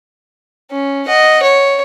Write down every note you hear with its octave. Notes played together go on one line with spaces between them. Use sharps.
C#4
D#5 F#5
C#5